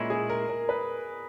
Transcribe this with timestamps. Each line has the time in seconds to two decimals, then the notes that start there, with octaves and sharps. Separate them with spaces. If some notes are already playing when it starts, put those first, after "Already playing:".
Already playing: A#2 G#3 C#4 E4
0.10 G#4
0.30 A#4
0.49 A#4
0.69 B4